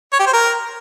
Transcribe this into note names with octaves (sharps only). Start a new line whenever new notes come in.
C#5
G4
C5
A#4